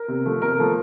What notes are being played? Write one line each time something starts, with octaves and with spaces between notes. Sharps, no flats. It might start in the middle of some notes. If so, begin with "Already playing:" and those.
Already playing: A#4
C3
F3 A3
C3 A#4
F3 A3